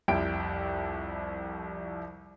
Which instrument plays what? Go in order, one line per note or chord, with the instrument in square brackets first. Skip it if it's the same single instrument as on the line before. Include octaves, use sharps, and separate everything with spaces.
[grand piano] C2 F2 C3 E4 G5 D7